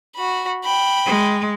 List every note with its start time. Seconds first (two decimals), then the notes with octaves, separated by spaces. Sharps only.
0.16 F#4 B5
0.64 G5 B5
1.06 G#3